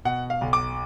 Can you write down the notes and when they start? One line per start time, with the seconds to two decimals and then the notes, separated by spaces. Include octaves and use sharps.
0.05 B2 F#5
0.30 F5
0.41 B1
0.53 D6